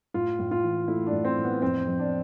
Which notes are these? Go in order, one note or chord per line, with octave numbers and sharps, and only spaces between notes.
A2 F4
A2
F4
E3
A3 E4
D4
A2
C4
A2
B3
F2 C4
F2
D4